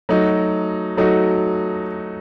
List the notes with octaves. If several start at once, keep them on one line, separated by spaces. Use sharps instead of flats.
F#3 A3 D#4 F#4
F#3 A3 D#4 F#4